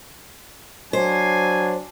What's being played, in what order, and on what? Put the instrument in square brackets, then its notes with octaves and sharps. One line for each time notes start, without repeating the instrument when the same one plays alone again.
[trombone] F#3 [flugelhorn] D4 [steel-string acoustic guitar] C5 [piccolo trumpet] G#5